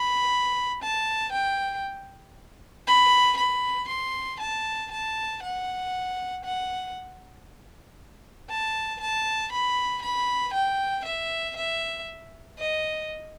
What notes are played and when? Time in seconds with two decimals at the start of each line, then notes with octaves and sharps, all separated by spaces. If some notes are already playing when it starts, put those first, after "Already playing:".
Already playing: B5
0.82 A5
1.32 G5
2.87 B5
3.37 B5
3.88 C6
4.40 A5
4.92 A5
5.43 F#5
6.44 F#5
8.50 A5
9.00 A5
9.52 B5
10.02 B5
10.53 G5
11.05 E5
11.56 E5
12.59 D#5